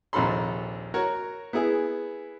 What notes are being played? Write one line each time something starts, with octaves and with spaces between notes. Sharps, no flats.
A#1 D#2 C3 A4 B5 C6
F#4 A#4 C#5
B3 E4 G#4